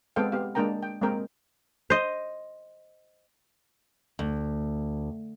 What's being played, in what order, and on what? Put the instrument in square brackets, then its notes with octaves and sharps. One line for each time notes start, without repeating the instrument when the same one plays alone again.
[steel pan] G#3 B3 C4 A4 F5 G5
B3 G4 F5
G#3 A#3 D4 A#4 G5 A#5
G5
G#3 A#3 C4 A#4 G5
[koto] C5 D#5
[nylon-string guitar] D2